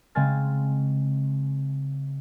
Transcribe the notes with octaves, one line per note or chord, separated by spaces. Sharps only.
C#3 G#3 C4 G#5 F6 A6